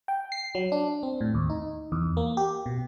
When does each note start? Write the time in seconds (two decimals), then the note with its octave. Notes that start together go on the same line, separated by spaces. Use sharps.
0.08 G5
0.32 C7
0.55 F#3
0.72 D4
1.03 C4
1.21 A2
1.35 D#2
1.50 D#4
1.92 E2
2.17 A#3
2.37 G4
2.66 B2